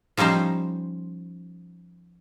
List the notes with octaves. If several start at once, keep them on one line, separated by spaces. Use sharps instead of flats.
F3 G3 C#4 D#4 C5